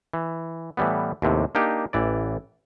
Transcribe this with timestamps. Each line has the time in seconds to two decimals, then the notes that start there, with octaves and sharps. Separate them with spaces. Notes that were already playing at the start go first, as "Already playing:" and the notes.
0.14 E3
0.77 A2 E3 G3 B3
1.22 D#2 A2 C3
1.55 A#3 D4 D#4 G4
1.93 A1 E3 D5